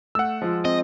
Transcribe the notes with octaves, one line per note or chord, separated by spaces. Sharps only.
A3 F#5 E6
F3 G#3
C4 D#5